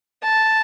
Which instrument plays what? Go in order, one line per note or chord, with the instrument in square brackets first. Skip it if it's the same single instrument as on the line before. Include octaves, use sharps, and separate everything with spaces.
[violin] A5